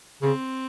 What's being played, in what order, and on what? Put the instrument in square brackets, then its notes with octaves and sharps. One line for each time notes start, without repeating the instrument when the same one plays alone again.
[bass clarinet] C#3 [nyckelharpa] C4